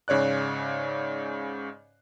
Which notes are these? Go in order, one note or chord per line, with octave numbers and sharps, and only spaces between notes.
G#2 C#3 C#5 D5 F#6